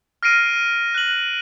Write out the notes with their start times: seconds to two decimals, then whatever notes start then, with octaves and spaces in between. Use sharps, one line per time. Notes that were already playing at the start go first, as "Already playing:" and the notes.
0.23 F6 A#6 C7 D7 D#7
0.95 F#6 F#7